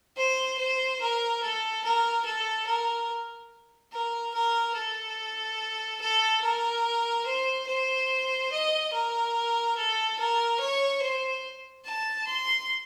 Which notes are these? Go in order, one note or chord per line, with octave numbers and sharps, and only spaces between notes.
C5
C5
A#4
A4
A#4
A4
A#4
A#4
A#4
A4
A4
A#4
C5
C5
D#5
A#4
A4
A#4
C#5
C5
A5
C6